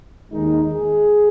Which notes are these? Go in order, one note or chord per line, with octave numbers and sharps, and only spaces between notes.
D#2 D#3 G#3 D#4
G#4